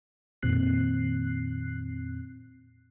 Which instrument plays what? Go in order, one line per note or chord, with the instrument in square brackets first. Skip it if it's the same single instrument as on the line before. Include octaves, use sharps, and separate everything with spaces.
[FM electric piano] F2 A#2 D#3 C4 F#6 C7